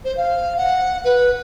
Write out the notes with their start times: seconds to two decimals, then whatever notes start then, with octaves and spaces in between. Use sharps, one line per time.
0.05 C5
0.17 F5
0.57 F#5
1.04 B4